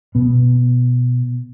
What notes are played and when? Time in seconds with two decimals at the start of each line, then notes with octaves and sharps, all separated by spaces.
0.15 B2 B3